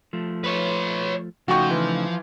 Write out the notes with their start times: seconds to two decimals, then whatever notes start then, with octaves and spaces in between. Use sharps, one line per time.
0.13 F3 A3
0.44 B4 C#5
1.48 C#3 F3 A3 D#4 F#4 G5 C#6
1.70 E3